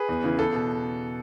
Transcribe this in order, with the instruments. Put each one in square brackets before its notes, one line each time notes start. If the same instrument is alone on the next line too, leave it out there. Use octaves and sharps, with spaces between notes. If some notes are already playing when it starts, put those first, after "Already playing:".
Already playing: [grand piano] G#4 B4
E2
C#3 E3
E2 A4
B2